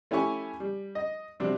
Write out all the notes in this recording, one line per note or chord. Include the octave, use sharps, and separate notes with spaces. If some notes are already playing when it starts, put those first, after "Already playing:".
A3 C#4 E4 G4 G#5 C#6
G3
D#5
C3 F#3 G3 C4 D4